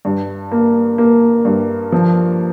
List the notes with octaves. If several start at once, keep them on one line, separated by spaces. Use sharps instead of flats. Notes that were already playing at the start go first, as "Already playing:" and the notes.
G2
A#3
A#3
G2
F3